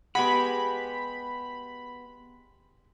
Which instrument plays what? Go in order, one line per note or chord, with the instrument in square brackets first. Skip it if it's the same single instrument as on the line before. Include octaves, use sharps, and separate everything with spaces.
[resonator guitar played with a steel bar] G#3 G4 [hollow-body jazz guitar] B3 F#5 [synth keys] B5